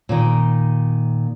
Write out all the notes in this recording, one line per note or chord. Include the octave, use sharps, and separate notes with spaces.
A#2 D#3